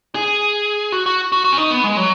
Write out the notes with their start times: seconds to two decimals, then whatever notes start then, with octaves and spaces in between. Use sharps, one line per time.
0.15 G#4
0.92 F#4
1.06 F#4
1.32 F#4
1.44 F#4
1.52 C#4
1.58 D#4
1.71 B3
1.84 G#3
1.97 F#3